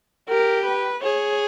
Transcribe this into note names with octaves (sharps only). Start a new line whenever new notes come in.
G4 A#4
B4
G#4 C#5